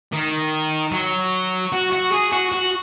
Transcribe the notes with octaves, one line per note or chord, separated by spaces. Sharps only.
D#3
F#3
F#4
F#4
G#4
F#4
F#4